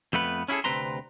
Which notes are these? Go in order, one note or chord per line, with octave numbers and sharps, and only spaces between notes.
F2 A3 B3 B4
C#4 E4 F#4 G#4 A4
D2 C3 C4 B4 A#5 C6